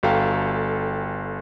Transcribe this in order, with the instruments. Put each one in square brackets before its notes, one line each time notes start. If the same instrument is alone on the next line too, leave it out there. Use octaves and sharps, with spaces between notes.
[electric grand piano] G1 F#4 A4 F5 G5 A#5